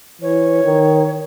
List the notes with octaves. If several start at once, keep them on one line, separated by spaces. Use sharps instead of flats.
E3 C#5
D#3